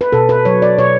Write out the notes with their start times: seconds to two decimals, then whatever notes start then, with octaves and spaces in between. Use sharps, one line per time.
0.01 B4
0.12 B2 A4
0.29 B4
0.45 F#3 C#5
0.62 D5
0.78 B2 C#5